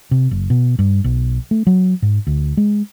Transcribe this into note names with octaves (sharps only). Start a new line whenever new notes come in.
C3
F#1
B2
G2
B1
A3
F#3
G#2
D2
G#3